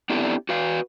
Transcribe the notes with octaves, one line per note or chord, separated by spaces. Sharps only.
B3 C4 D4 E4 G4 A4
F#4 B4 F5